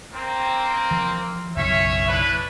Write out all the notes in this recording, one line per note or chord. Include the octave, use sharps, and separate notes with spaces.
A#3 C4
E3 F3
F#1 B1 C#4 C#5 E5
D4 E4 B4